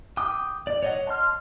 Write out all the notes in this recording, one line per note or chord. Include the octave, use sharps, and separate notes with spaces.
G5 D6 D#6
D5
C#5 D#5 F#5
A5 C6 F6